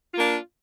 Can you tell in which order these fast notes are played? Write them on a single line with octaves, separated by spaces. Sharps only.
F4 A#3 D4